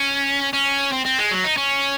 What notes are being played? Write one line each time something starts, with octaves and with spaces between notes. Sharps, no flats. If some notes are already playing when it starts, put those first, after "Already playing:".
Already playing: C#4
C#4
C4
C4
G#3
F#3
D#4
C#4